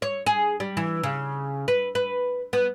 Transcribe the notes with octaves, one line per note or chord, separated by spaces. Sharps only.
C#5
G#4
G3
E3
C#3
B4
B4
B3